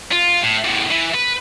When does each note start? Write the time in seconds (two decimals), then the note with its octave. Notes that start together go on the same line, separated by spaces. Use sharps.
0.12 F4
0.42 A2
0.65 E2 A2
0.91 E3
1.14 B4